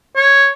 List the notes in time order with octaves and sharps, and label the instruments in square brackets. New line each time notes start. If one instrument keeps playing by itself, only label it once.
[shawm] C#5